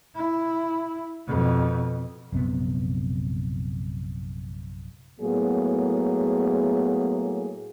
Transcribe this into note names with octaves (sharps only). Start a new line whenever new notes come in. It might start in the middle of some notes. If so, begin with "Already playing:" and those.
E4
F2 B2
A#1 F#2 C3 B3
A2 F#3 A#3 B3 G#4